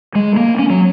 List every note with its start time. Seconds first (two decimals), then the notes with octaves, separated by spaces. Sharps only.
0.15 G#3
0.37 A#3
0.59 C#4
0.70 F#3